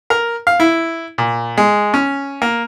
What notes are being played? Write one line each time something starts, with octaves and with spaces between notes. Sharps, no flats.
A#4
F5
E4
A#2
G#3
C#4
A#3